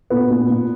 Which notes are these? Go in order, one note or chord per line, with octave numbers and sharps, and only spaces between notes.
A#2 B3
A#2
A#2